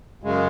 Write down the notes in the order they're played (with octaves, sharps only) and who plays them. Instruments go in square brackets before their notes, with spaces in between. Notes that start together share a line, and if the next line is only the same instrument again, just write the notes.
[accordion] F#2 C#3 G#3